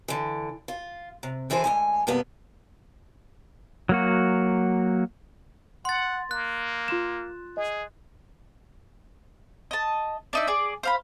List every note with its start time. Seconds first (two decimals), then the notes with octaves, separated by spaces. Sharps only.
0.08 D3 E3
0.68 F4
1.23 C3
1.50 D3 E3 G#4 B4 C5
1.64 D2 G#3 G#5
2.07 G2 C3 F3 A#3 B3
3.89 F#3 A#3 F#4
5.85 F#5 C6 A6
6.31 A#3 F#6
6.88 F4 C6 E7
7.57 G#4 D#5
9.71 D#5 A5
10.33 D4 D#4 E5
10.47 G#4 D5
10.83 C5 F5 B5